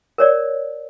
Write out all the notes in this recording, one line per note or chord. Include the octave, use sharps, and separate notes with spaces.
A#4 C#5 D5